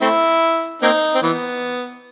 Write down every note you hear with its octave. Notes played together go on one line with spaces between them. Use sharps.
A3 C4 E4
A#3 C4 D#4
C4
E3 B3